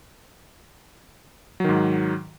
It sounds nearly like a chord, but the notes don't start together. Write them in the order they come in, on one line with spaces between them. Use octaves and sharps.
F#3 D#3 G#2